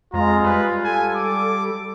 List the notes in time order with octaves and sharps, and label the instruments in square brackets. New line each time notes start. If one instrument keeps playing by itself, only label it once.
[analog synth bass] F2 [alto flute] G#3 [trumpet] F4 [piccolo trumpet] A#5
[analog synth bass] G3 [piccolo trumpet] B4
[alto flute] A4 [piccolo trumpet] G#5
[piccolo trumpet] D6